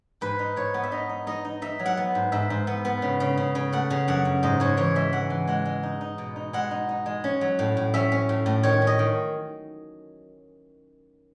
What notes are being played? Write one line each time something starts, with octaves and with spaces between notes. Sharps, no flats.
G#2 B4
D#4
G#2 C#5
B3
E5
D#4 D#5
D#4
D#4 D#5
D#4
D#4 E5
F#3
F#5
B3
G#2
G#2 E5
G#2
B3
B3
C#3
C#3
C#3
C#3
A3 F#5
C#3
F#2 F#5
F#2
G#2 D#5
G#2 C#5
E3 C#5
G#3 E5
E3 F#5
E3
G#3 F#5
G#3
D#4
D#4
B2
D#4
G#3 F#5
D#4
D#4
G#3
C#4
F#3
A2
A2
C#4 E5
C#4
A2
A2
D#3 C#5
C#4
D#5
D#3